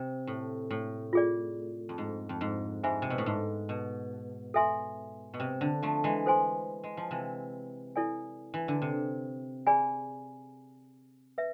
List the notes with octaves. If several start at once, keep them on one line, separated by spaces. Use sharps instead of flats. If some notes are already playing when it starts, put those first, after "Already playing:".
Already playing: C3
A2
A2
F4 G#4 D5
F2
G#2
F2
G#2
G#2 G#4 C5 E5 G#5 B5
C3
B2
A2
G#2
B2
A4 E5 G#5 C6
B2
C3
D3
F3 A3
E3 G#3
A4 C5 G#5 C6
G#3
F3
C3 E3
E4 A4 D5 G#5
E3
D3
C3
G#4 D5 G#5 B5
B4 E5